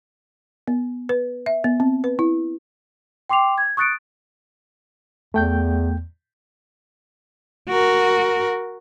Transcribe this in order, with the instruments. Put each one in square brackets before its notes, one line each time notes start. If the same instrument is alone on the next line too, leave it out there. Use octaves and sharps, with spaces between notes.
[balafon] B3
B4
E5
B3
C4
B4
E4
[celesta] G5 C6 D6 C7 F7
G#6
C#6 D#6 F#6 A6 C#7 D7
[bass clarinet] E2 [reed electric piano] A3 G5 G6
[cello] F#4 A#4